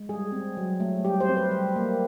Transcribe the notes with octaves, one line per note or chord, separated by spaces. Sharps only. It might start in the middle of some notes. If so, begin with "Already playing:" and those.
Already playing: G#3
G3 G#4
C4
F#3
A3
G3 G4
C5
C4
B4
G3
A#3